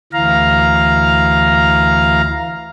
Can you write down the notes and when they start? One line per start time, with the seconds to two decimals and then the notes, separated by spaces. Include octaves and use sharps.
0.13 D2 E3 F5 A#5